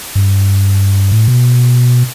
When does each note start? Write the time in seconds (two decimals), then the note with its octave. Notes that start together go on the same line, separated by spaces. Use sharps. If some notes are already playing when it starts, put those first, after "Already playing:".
0.15 G2
1.12 A2
1.28 B2